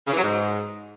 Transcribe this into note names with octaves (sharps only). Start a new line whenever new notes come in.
C#3
E3
F#3
G#2